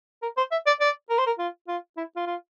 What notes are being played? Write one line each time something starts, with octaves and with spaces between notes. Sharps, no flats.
A#4
C5
E5
D5
D5
A#4
C5
A#4
F4
F4
E4
F4
F4